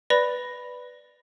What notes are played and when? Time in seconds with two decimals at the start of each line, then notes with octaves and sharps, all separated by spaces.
0.10 B4 D5 B5 A#6 F7